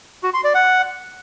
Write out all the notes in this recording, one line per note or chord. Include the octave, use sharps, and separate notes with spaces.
F#4
C6
D5
F#5